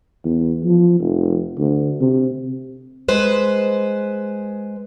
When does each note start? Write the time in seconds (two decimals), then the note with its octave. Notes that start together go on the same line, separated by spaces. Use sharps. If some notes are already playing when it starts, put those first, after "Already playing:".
0.25 E2
0.65 F3
1.00 F1
1.59 D2
2.00 C3
3.08 G#3 B4 C5